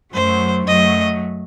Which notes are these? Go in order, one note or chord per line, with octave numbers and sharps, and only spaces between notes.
F#2 F#3 A3 C5
F#2 F#3 A3 D#5